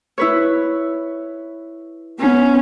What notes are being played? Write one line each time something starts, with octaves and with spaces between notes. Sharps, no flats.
E4 B4 C#5
B3 C#4